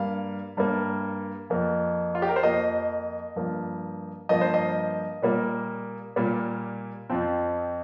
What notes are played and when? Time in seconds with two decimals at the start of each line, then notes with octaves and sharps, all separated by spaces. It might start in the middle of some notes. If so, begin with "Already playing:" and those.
Already playing: G2 G3 A#3 F5
0.57 G2 G3 A#3
1.50 F2 F3 A#3
2.15 F4
2.22 G4
2.29 A#4
2.36 C5
2.43 F2 F3 A#3 D#5
3.36 G2 F3 A#3
4.29 G2 F3 A#3 D#5
4.41 C5
4.54 D#5
5.22 A#2 G3 A#3
6.16 A#2 G3 A#3
7.10 F2 F3 C4